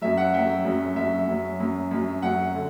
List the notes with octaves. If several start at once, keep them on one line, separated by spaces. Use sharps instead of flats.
F#2 F#3 E5
F#5
F#2 F#3 E5 G5
F#2 F#3
F#2 F#3 E5
F#2 F#3
F#2 F#3
F#2 F#3
F#2 F#3 F#5
D3